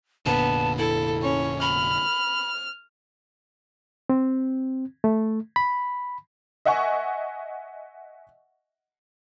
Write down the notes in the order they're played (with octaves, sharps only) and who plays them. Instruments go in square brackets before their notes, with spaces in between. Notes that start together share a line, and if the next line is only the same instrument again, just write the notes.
[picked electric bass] F1 A#2 D3 [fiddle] B3 [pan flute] A5
[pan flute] E4 [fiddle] A4
[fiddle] C#4 C#5
[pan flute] B5 [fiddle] F6
[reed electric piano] C4
A3
B5
[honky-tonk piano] D#5 E5 F#5 G#5 C#6